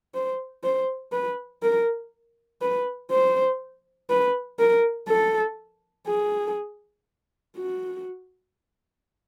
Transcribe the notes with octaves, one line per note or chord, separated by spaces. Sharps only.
C5
C5
B4
A#4
B4
C5
B4
A#4
A4
G#4
F#4